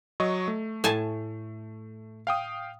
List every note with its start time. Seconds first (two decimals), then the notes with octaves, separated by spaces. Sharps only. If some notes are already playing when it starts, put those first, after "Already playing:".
0.20 F#3 D#5 C#6
0.48 A3
0.84 A2 G#5 A5
2.27 F5 G5 D#6